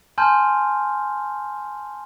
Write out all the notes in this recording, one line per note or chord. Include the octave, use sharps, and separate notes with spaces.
G#5 A5 C6 F6 G6